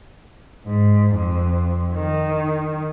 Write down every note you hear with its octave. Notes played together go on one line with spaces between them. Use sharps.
G#2
F2
D#3